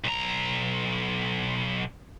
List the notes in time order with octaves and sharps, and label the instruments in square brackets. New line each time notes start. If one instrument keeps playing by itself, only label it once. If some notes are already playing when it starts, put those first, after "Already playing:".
[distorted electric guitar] B1 A#5